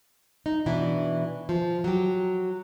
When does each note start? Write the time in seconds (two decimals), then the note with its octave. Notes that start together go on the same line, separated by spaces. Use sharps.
0.46 D#4
0.66 B2 E3 D4 E4
1.49 F3
1.84 F#3 G4